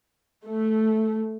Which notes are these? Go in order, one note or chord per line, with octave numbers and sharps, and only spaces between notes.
A3